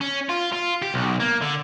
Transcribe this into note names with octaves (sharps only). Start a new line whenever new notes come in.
C#4
F4
F4
G4
B1
A#3
D3